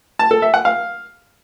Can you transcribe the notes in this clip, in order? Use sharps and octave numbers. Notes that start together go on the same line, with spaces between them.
A5
A4
E5
F#5
F5